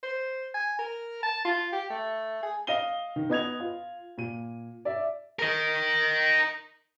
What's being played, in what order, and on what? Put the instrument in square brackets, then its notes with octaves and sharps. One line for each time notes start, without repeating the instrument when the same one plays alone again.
[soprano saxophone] C5
G#5
A#4
A5
F4
G4
A3
G#4
[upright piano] D#5 F5 A#6 D#7 G7
D#3
B3 D#5 G#6 F7
F4
A#2 D#7
D5 E5
[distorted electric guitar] A#4 D#5